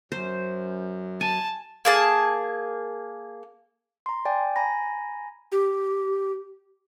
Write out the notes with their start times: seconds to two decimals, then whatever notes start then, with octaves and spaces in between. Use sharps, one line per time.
0.12 F#2 C5
1.21 G#5 A5
1.85 A#3 G#4 A5
4.06 A#5 C6
4.25 D5 G5 G#5
4.56 G#5 A#5 B5 A#6
5.52 G4